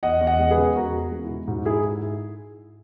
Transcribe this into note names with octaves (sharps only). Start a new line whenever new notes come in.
E2 D#5 F#5
E2
D#5 F#5
G#3
G#4 B4
C#3
E2 F#4 A#4
E2
G#3
E4
C#3
G#2 F#4
G#2 E4 G#4